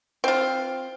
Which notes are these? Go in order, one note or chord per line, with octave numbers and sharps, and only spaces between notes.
C4 F4